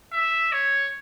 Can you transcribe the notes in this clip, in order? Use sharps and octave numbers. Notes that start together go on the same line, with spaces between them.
E5
C#5